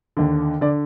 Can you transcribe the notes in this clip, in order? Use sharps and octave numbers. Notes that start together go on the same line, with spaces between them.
D#2 D3
D3 D5